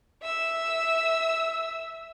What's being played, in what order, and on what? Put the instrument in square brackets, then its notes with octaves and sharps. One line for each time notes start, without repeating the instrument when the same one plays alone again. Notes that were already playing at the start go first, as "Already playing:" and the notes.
[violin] E5 E6